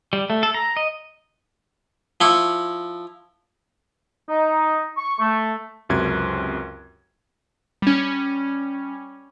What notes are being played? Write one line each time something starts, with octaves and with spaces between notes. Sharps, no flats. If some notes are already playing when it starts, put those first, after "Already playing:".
G3
A3
A4
A#5
D#5
F3 E4 C#6
D#4
C#6
A3
C#2 F#2 C3 G#6
G3 C#4